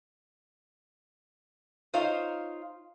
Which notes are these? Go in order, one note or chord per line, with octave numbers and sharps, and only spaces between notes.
D#4 F4 C5 C#5 D#5 F5